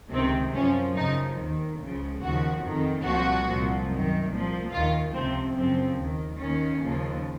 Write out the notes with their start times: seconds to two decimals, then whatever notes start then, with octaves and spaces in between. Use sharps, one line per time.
0.12 C#2 C3 D#3 C4
0.54 F#2 F3 C#4
0.96 F#2 C#3 F3 D#4
1.38 D#2 D#3
1.80 C#2 C#3 F3
2.21 D#2 C#3 F3 F#4
2.64 F2 D#3
3.05 C2 A#2 F3 F#4
3.46 C2 A#2 F3
3.88 F#2 D#3
4.30 C2 A#2 F3
4.72 D#2 D#3 F4
5.14 C#2 C3 F3 C4
5.56 F#2 C#3 F3 C4
5.97 D#2 D#3
6.39 D#2 D#3 C#4
6.81 D#2 C#3 F3